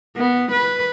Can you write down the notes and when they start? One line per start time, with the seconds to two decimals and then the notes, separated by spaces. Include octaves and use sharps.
0.16 B3
0.52 B4